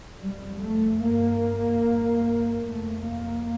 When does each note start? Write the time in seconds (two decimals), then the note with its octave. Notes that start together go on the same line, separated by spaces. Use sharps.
0.20 F2 C3 G3
0.61 A3
1.02 G2 A#3
1.83 G2
2.63 F2 C3 A3
3.04 A#3